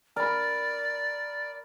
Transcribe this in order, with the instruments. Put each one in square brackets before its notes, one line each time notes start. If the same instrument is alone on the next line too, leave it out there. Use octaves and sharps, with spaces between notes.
[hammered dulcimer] A#4 B5 [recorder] D5